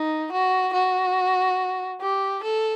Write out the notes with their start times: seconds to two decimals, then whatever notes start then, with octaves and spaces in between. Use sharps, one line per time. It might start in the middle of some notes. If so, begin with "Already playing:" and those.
Already playing: D#4
0.32 F#4
0.73 F#4
2.01 G4
2.43 A4